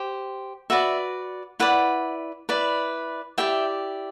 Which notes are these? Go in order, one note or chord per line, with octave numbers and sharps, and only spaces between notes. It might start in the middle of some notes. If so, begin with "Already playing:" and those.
Already playing: G4 C5
F#4 B4 D5 E5
E4 B4 D5 F#5
E4 B4 D5
E4 G4 D5 E5 G5